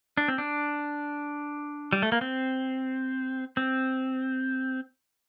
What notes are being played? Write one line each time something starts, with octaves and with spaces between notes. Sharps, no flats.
D4
C4
D4
G3
A3
A#3
C4
C4